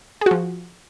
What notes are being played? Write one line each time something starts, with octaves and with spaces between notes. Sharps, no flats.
F3 F#4 G#4